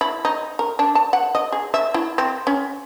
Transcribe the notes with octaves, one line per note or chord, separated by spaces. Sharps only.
E4
D#4
A#4
D4
A5
F#5
D#5
G#4
E5
E4
C4
C#4